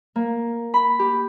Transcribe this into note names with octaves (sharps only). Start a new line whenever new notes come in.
A#3
B5
G4